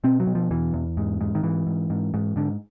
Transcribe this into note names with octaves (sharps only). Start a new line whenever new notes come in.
B2 C4
F#3
B2
F3
E2 E3
E2
G#2
G#2
D#3
G#2 E3
G#2
G#2
G#2
G#2 D3